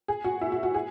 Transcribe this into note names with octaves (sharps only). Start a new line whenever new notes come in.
G#4
F#4
E4
F#4
F#4
G#4